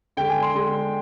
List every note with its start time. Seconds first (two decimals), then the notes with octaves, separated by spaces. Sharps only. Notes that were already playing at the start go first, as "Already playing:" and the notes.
0.17 D3 G#3 G5
0.30 G#5
0.42 C6
0.54 D3 G#3